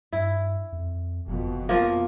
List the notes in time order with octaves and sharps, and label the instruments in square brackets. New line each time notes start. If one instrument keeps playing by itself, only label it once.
[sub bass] G2 [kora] E4
[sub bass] F2
[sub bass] F#1 [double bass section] F2 B2
[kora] F3 A#3